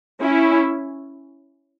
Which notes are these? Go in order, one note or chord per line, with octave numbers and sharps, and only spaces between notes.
C#4 E4